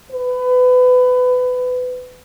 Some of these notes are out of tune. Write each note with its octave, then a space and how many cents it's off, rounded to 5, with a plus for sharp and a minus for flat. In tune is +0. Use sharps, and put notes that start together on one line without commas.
B4 +25